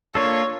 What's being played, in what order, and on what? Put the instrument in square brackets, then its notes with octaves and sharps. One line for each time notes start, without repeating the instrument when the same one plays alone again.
[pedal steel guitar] A#3 D4 F4 A4 [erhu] C#5